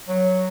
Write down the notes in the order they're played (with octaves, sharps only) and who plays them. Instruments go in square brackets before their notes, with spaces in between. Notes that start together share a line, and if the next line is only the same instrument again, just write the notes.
[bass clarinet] F#3